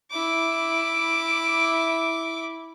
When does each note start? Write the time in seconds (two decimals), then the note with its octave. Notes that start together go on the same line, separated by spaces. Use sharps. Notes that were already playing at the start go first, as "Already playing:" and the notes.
0.11 E4 D6